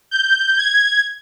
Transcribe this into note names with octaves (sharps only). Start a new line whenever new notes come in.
G6
G#6